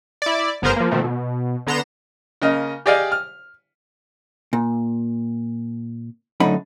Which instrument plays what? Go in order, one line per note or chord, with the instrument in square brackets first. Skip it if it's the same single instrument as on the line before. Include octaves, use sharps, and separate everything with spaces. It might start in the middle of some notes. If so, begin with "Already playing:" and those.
[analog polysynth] E4 D5
G1 B3 G#4 A#4 C5 A#5
F3 A#3
B2 D#3 F3 A3 C4
B2
D3 B3 A#5 C6 E7
[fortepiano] C#3 A#3 D#5
G4 G#4 D5 D#5 F5 G5
F6
[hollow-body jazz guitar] A#2
F#2 A2 D3 D#4 B5